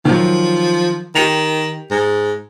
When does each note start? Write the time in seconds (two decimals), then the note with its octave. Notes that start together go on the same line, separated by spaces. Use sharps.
0.05 D#3 F3 F#3
1.15 D#3 G4 C#7 F7
1.91 G#2